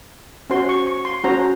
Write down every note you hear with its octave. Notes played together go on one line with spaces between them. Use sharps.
C#4 F#4 C5 C6
C#6
C#6
C6
C#4 F#4 C5 A#5